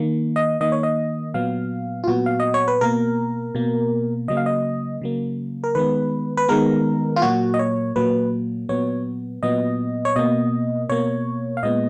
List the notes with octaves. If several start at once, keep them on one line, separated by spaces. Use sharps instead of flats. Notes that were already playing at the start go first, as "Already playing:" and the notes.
Already playing: D#3 A#3
D#5
D#3 A#3 D#5
C#5
D#5
A#2 F#3 B3 F5
F4
A#2 F#3 B3 F#4
F5
D#5
C#5
B4
B2 A#3 A#4
B2 A#3
C#3 F#3 A#3 D#5
F5
D#5
C#3 F#3 A#3
A#4
D#3 G#3 B3 B4
B4
D#3 G#3 B3 A#4
F4
A#2 F#3 A#3 F#4
D#5
C#5
A#2 F#3 A#3 B4
A#2 F#3 B3 C#5
A#2 F#3 B3 D#5
C#5
B2 A#3 D#5
B2 A#3 C#5
F5
A#2 G#3 B3 D#5